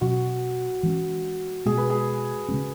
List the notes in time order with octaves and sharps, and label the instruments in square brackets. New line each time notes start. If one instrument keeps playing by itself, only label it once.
[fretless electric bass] B2 F#3 C#4 [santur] F#4
[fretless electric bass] E3 G#3 C#4
[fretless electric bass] B2 G#3 B3 [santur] G#4
[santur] B4
G#4
[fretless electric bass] C#3 G#3 C#4